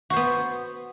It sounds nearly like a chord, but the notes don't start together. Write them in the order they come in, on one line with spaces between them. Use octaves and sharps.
F#4 C5 B3